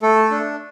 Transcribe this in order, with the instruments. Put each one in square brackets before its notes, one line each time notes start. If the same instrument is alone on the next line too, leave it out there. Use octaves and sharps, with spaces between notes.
[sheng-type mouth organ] A3 A4
D4